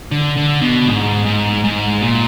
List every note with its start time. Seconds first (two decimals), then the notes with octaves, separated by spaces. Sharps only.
0.11 D3
0.37 D3
0.62 B2
0.88 G#2
1.26 G#2
1.64 G#2
2.02 A#2